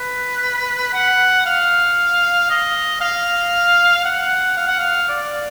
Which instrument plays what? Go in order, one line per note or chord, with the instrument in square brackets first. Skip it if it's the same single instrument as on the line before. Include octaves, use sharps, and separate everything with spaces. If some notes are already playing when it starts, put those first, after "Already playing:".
Already playing: [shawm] B4
F#5
F5
D#5
F5
F#5
F5
F#5
F5
D5